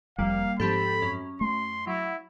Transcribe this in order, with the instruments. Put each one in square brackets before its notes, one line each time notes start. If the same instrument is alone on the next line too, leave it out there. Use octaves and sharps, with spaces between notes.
[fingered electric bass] F1 F2 [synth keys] G3 A#3 [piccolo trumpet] F5
[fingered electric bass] G#2 F3 [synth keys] C4 G4 A4 [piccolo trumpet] B5
[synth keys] F#2 C#4
[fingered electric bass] A3 [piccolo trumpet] C6
[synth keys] F#3 [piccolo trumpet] E4